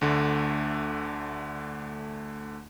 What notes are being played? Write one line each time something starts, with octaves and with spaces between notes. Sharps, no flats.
D2 D3 A3